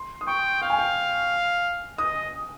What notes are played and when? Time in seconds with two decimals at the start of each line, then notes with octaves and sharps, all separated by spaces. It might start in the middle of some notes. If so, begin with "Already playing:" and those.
Already playing: C6
0.21 D#6
0.27 G5 C#6
0.62 F5 G5
0.70 G#5
0.79 G5
1.98 D#5 D#6